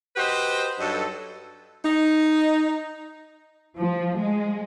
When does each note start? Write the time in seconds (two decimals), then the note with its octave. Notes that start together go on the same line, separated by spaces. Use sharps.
0.16 F#4 G4 B4 C5 D#5
0.79 G2 F#3 D#4 A4
1.85 D#4
3.79 F3
4.17 G#3